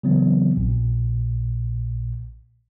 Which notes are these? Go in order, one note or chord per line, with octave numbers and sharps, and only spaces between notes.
C#3 E3 F#3 B3 C4
A#1 A#2